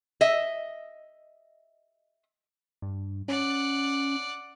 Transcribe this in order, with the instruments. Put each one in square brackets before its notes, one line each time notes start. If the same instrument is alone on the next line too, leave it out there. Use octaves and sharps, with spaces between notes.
[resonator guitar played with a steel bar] D#5 E5
[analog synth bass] G2
[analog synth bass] C#4 [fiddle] D5 F#5